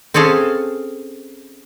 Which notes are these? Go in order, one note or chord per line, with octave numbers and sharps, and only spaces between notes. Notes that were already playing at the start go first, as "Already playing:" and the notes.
C4 C#4 G#4 A4 F5